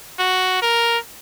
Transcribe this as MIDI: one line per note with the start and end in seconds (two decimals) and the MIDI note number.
0.19 0.58 66
0.62 0.98 70